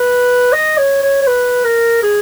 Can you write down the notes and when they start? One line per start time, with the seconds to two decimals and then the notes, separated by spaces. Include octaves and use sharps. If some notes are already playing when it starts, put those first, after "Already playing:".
Already playing: B4
0.53 D#5
0.78 C#5
1.03 C#5
1.22 C#5
1.27 B4
1.65 A#4
2.03 G#4